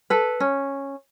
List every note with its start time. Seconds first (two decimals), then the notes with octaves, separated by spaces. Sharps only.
0.10 A4 B4
0.40 C#4